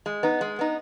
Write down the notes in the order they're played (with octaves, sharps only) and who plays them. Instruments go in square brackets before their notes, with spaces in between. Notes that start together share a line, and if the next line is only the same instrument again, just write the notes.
[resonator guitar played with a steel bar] G#3
B3 D#4
G#3
B3 D#4